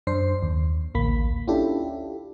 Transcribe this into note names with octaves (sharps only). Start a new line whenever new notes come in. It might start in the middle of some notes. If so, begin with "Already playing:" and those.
F#2 D4 C5 C7
D#2
A1 D2 A#3 B5 B6
C#4 D4 E4 F4 G4 A4